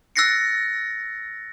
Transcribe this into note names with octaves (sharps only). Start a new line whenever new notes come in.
E6 F#6 A6 A#6 C7 C#7